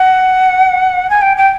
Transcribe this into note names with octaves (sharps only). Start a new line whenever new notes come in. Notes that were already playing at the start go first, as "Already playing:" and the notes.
Already playing: F#5
G#5
G5
G5